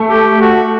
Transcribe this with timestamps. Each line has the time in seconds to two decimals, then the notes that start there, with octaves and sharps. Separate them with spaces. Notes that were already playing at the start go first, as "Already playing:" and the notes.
Already playing: A3
0.10 G4
0.41 F#4